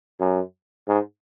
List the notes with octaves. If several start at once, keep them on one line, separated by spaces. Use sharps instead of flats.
F#2
G#2